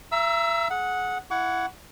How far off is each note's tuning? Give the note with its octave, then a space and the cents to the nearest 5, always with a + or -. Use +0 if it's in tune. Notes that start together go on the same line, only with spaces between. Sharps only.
E5 +35 A#5 +10 E6 +0
G#4 +25 F#5 -10
E4 +20 F#5 +0 C#6 +40